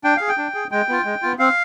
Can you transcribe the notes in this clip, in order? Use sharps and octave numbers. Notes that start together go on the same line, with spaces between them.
D4 G5
G#4 F5
G5
D4
G#4
G#3 G5
B3 F4
G#3
B3 F4
C4 F5